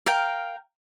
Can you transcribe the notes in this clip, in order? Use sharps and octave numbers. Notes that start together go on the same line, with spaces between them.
A#4 F5 G5